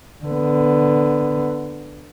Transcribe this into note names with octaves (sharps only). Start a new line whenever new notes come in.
D3 B3